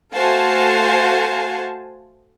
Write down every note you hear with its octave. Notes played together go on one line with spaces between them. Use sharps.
A3 F#4 C5 F5 G#5 A5